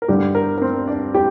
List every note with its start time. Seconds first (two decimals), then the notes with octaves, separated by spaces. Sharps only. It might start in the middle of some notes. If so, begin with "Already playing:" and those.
0.02 A#4
0.08 G2 D3 G4
0.35 A#4
0.58 A#4
0.62 C4 C5
0.87 D4 D5
1.15 G4 G5